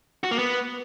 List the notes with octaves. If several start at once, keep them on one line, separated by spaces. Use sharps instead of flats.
F#4
A#3
B3